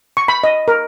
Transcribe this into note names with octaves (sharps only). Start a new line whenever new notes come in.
C#6
B5
D#5
A#4